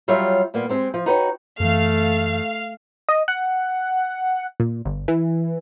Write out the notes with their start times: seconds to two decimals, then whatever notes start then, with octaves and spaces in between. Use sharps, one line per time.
0.08 F#3 G3 F4 G4 C#5 E5
0.54 A#2 G3 A#3 B3
0.69 G#3 C4 G4 G#4
0.94 F3
1.06 D#4 F#4 B4 C#5 G5
1.60 F#2 E3 A3 F5
3.09 D#5
3.28 F#5
4.60 A#2
4.85 G1
5.08 E3